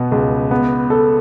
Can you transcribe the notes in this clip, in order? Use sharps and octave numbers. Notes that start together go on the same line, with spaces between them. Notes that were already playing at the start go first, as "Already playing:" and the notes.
Already playing: B2 B3
C#2
B3
A4